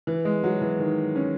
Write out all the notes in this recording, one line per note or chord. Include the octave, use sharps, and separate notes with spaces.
E3
G#3
F#3
E3
D#3
C#4